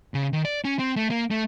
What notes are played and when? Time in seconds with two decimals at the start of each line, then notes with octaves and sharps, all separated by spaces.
0.14 C#3
0.33 D#3
0.45 D5
0.65 C#4
0.79 C4
0.96 A3
1.10 A#3
1.31 A3